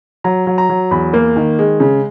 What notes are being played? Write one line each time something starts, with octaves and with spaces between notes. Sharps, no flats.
F#3 A#5
F#3
A#5
F#3
E2 B5
A#3
D#3
G#3
C#3